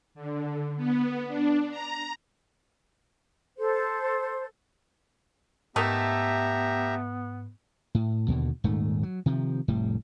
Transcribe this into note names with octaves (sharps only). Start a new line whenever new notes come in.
D3
B3
D4
A#5
A4 C5
G#2 A3 B3 G4 A#4 D#5 E5 A#5
A2
D#2 B2 D3
D#1 G#2 D#3 A3
F#3
C3 D#3 F3
F1 A2 G3